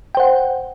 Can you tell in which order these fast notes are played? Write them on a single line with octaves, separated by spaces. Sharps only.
G5 C5 F#5